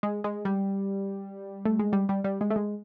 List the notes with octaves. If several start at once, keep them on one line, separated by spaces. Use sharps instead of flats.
G#3
G#3
G3
A3
G#3
G3
G3
G3
G#3
A3
G#3